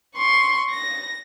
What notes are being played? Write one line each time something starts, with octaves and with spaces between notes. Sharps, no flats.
C6 C#6
A#6